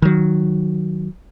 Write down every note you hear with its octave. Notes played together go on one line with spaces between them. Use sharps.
D#3 F#3